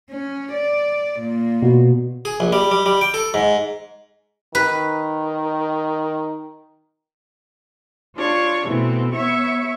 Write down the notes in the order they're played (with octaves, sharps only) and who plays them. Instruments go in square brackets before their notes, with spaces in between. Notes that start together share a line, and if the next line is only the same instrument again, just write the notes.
[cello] C#4
D5
A#2
[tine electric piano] B2
[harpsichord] G#4
A#1
G3
G3
G3
G5
A4
G#2
[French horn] D#3 [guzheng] B4
[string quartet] D4 F4 C#5
B2 E3 A3 C4
B3 C#5 E5 C#6